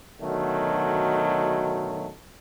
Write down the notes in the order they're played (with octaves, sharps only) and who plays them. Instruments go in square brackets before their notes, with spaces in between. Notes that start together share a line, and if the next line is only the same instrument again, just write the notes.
[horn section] B2 D3 D#3 F#3 A3